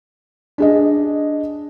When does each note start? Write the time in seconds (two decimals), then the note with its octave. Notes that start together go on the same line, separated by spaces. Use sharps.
0.58 D4 G#4 D#5